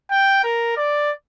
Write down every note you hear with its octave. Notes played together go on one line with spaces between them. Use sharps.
G5
A#4
D5